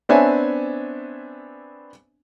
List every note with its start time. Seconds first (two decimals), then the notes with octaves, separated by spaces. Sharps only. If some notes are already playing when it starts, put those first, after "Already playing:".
0.09 B3 C4 D4 C#5 E5 G#5